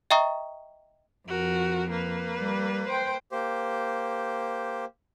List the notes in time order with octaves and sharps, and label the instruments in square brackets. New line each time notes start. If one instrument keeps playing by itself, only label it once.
[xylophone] D#5 E5 G5 A#5 C#6 D#6
[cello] F2 [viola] F#4 A#4
[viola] A#3 B4
[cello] G3
C5 G5
[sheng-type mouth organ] A#3 G4 C5